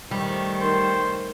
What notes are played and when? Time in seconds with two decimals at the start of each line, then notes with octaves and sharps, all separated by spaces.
0.11 D#3 G3 A3 C5 D6
0.60 D#4 A#4 C5 F#5